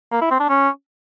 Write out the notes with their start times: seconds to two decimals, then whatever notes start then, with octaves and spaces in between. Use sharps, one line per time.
0.12 A#3
0.21 E4
0.31 C4
0.40 D4
0.49 C#4